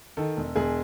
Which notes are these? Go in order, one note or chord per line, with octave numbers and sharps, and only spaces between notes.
D#3 A4
E1
E1 G#4